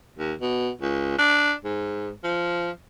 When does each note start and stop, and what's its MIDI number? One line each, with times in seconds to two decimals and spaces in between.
0.19 0.33 39
0.41 0.70 47
0.82 1.18 37
1.18 1.53 62
1.64 2.11 44
2.24 2.70 53